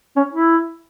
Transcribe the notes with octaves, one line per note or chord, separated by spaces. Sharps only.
C#4
E4